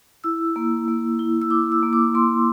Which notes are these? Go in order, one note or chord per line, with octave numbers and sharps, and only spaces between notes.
E4 E6
A#3
A#3
E4
E6
E4 D6
E6
A#3
D6
A#3 C6